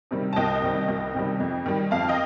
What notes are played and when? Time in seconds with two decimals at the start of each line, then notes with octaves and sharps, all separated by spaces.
0.11 C3 D#3 G3
0.33 A5
0.36 C2 D#5 G5
0.62 C3 D#3 G3
0.88 C2
1.14 C3 D#3 G3
1.40 F2
1.66 D#3 G3
1.91 F2 F5 A5
2.09 D#5 G5